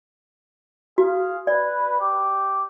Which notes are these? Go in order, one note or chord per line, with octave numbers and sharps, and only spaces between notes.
F#4 G#4 F5
B4 D5
G4 D6